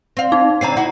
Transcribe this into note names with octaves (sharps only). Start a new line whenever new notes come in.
C4 F5
D#4
D3 C4 C#4 A#5 C7
D#4 E4 F#4